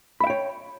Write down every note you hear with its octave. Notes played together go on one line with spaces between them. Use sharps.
C#5 E5 G5 B5